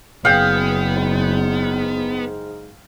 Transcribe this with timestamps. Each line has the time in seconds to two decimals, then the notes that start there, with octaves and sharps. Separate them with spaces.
0.25 F#1 B3 G#4 F5 G5
0.96 G#2